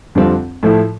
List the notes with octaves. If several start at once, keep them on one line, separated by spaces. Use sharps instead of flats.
F2 D3 G3 C4 F4
A2 F3 A3 E4